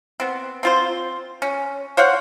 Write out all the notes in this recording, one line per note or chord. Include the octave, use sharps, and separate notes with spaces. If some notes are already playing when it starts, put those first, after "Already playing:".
B3 C4
C4 F4 C5
C#4
C5 C#5 F5 F#5